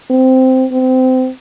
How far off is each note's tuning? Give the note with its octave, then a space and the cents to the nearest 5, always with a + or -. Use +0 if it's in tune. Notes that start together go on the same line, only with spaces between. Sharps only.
C4 -10
C4 -25